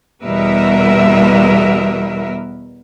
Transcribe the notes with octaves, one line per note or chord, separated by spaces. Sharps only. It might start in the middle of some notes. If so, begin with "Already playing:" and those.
E2 B2 G3 A#4 B4 E5